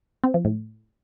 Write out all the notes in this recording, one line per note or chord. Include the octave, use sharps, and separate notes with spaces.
C4
F3
A2